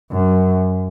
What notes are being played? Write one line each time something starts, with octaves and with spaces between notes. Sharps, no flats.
F#2